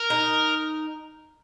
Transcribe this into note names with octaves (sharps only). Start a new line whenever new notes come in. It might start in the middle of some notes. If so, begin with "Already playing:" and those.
Already playing: A#4
D#4